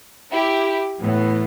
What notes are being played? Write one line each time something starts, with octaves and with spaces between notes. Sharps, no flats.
E4 G4
A2 E3 B3